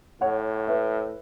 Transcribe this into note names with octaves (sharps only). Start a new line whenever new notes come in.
A2 C#5 F#5
B4 E5